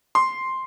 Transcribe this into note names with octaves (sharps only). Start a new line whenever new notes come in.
C6